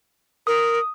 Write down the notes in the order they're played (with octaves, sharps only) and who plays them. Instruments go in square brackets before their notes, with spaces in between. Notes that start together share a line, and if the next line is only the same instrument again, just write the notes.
[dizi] A#4 [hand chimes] D#6